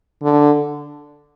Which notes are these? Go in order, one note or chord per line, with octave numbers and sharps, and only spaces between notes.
D3